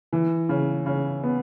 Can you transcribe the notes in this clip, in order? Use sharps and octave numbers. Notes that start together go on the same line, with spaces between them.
E3
C#3
C#3
B3